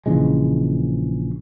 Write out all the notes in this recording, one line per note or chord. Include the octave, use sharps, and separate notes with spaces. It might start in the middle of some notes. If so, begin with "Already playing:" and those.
A#1 C#3 E3 G#3